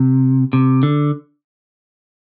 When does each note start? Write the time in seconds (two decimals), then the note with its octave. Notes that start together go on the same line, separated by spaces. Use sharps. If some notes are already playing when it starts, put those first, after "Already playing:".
Already playing: C3
0.53 C3
0.83 D3